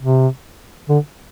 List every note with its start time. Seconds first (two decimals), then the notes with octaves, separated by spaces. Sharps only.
0.02 C3
0.89 D3